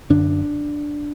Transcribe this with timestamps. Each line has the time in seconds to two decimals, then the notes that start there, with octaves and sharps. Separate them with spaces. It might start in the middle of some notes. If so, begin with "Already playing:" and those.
0.10 F#2 D3 D4